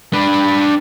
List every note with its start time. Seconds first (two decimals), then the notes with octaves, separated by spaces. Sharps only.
0.13 D4 B4